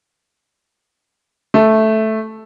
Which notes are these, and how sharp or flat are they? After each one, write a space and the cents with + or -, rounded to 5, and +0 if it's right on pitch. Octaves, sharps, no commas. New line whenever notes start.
A3 -5